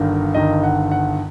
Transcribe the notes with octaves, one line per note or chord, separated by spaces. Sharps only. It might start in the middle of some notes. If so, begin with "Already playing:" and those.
Already playing: G1 G2 D#3 A#4
G1 G2 D#3 D#5
F#5
F#5